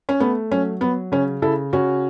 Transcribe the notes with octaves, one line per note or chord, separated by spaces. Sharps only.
C#4
A3 B3
F#3 C#4
F#3 B3
C#3 C#4
C#3 E4 A4
C#3 C#4 F#4